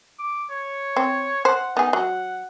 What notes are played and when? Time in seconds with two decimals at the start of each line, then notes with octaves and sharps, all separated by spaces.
0.19 D6
0.50 C#5
0.97 C4
1.45 C5 F#5
1.77 B3 D#4 G#4
1.93 F#3 F#5